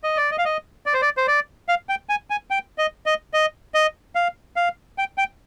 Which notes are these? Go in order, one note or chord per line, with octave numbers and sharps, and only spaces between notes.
D#5
D5
D#5
F5
D#5
D5
C5
D5
C5
D5
F5
G5
G#5
G#5
G5
D#5
D#5
D#5
D#5
F5
F5
G5
G5